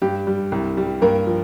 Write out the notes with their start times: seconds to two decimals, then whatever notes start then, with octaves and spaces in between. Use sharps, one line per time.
0.02 G2 G4
0.27 G3
0.52 C2
0.77 G3
1.02 G2 A#3 A#4
1.27 F3